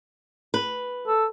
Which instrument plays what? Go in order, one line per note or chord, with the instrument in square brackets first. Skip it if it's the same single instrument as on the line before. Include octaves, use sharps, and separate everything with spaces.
[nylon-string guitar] B4
[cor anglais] A4